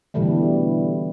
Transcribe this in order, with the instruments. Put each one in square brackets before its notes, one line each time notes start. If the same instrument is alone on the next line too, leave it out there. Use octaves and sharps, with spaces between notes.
[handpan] B2 D3 E3 G3 A3